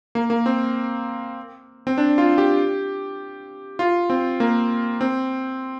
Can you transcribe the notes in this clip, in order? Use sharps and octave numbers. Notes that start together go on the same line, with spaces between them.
A#3
A#3
C4
C4
D4
F4
G4
F4
C4
A#3
C4